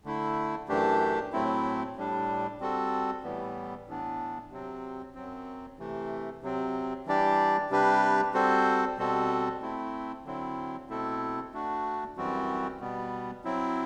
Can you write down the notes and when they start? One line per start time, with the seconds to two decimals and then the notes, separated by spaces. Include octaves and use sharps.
0.04 D3 A3 E4
0.68 F#2 E3 A3 D4 G4
1.32 A2 F#3 A3 C4 E4
1.96 A2 G3 D4
2.60 G3 C4 F#4 A4
3.23 A2 E3 G3 B3
3.87 A2 E3 B3 D4
4.50 C3 F#3 C4
5.15 F#2 F#3 C4
5.79 C3 E3 A3
6.43 C3 F#3 C4
7.06 E3 G3 D4 G4 D5
7.70 C3 G3 D4 G4 B4
8.34 G3 C4 F#4 A4 C5
8.98 B2 G3 C4 F#4 A4
9.61 A3 C4 E4
10.25 D3 F#3 C4 E4
10.89 B2 A3 C4 E4 A4
11.53 A3 D4 F#4
12.17 F#2 E3 G3 C4 F#4
12.80 B2 G3 B3
13.44 F#3 C4 E4